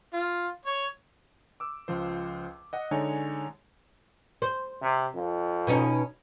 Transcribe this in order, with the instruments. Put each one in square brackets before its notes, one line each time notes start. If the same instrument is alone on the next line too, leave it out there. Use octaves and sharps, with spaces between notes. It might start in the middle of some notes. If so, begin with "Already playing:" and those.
[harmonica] F4
C#5
[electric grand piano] D6 E6
C#2 F3 C5
D#5 F#5
D3 G#3 D#4 C#5 G#5
[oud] C5
[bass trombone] C3
F2
[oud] B2 C#4 D#4